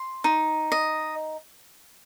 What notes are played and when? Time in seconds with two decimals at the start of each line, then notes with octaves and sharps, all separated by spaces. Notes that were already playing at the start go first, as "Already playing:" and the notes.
Already playing: C6
0.24 D#4
0.72 D#5